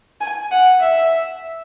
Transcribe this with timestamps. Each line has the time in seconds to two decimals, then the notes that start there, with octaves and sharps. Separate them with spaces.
0.21 G#5
0.51 F#5
0.80 E5